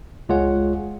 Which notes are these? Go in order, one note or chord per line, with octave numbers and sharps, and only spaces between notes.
C#2 G#3 F4 G#4 C#5 F#5